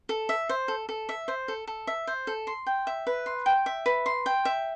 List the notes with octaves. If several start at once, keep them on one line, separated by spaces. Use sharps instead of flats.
A4
E5
C5
A4
A4
E5
C5
A4
A4
E5
C5
A4
C6
G5
E5
B4
C6
G5
E5
B4
C6
G5
E5